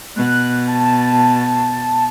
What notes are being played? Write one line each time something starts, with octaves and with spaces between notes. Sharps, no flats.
B2 F#6
A5